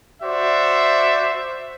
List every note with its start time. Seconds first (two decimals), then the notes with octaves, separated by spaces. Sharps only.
0.22 F#4 C5 D5 E5